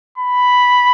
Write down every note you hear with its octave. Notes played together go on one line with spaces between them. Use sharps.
B5